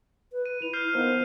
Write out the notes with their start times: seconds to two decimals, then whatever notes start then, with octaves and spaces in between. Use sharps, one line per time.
0.32 B4
0.46 D#7
0.62 E4 F7
0.73 F6 G6 C7
0.94 D#3 F3 B3